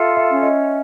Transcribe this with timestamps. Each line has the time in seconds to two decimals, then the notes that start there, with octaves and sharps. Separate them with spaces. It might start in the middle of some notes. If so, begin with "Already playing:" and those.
Already playing: F4 A4 E5
0.17 E5
0.29 C#4
0.43 D#5